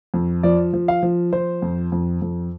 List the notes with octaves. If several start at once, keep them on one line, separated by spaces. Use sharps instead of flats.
F2
F3 D5
F3
F5
F3
F3 C5
F2
F2
F2